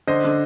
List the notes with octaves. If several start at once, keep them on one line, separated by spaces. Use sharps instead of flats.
D3 C5 D#5
D3